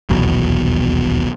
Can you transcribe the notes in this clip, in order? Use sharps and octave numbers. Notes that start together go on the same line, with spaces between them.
D#1 B1 E2 B2